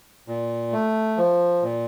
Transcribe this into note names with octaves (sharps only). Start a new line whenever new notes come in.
A#2
A3
F3
A#2